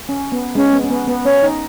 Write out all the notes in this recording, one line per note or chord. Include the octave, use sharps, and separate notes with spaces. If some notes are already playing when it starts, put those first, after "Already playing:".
C#4
B3
G#3 C#4
B3
C#4
B3
B3
C#4 C#5
D#4